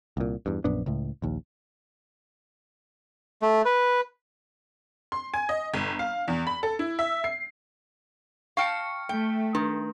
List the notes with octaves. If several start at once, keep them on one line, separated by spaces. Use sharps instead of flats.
C2 A#2
E2 G2
A#1 F#2 B3 D4
C#2 A2
A#1 D#2
A3
B4
C6
G#5
D#5
G1
F5
E2
B5
A4
E4
E5
C7
F5 G5 A5 C#6 F6 C#7
A3 G5
D#3 D4